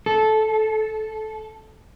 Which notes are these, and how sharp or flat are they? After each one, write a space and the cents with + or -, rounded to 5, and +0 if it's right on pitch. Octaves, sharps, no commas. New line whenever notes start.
A4 -15